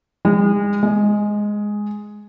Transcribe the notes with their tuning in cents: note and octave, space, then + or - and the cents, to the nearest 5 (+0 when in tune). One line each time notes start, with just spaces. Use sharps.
G#3 -35
G#3 +0